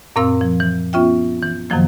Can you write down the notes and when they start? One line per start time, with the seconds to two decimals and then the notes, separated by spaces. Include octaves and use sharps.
0.16 F#2 A#2 C4 A#4 F5 E6
0.41 F3
0.60 E3
0.93 B3 C#4 F4 E5 G5
1.42 E3
1.70 F#2 C3 D#3 F3 F#3 A#3